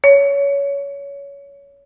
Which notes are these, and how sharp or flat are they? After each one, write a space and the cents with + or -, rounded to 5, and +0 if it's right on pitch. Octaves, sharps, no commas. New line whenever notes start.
C#5 +20